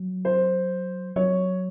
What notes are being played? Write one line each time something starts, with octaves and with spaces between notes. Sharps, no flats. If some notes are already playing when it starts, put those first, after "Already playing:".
Already playing: F#3
C5
F#3 C#5